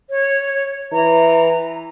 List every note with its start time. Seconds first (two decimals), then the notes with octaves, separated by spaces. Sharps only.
0.10 C#5
0.92 E3 A#5